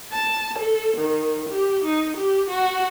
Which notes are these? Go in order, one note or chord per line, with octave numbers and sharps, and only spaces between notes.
A5
A4
D#3
G4
D#4
G4
F#4